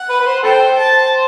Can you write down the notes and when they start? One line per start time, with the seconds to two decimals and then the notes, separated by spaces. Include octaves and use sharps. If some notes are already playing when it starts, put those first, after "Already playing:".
Already playing: F#5
0.09 B4
0.20 B4
0.26 C5
0.44 A4 C5 G5
0.78 A5